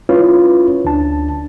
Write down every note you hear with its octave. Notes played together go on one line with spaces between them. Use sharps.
C#4 E4 F4 B4 C#5
D2 D4 A5